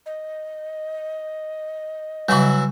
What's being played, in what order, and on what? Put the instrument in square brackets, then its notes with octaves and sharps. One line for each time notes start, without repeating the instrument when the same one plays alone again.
[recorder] D#5
[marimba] C#3 G3 [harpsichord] E3 F#3 E4